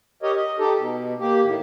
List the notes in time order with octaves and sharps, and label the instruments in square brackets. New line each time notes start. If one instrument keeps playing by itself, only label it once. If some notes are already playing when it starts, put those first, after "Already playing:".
[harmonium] G4 A#4 C#5 D#5
D#5
D#4 G4 A4
B2
A#3 G4
A2 D#3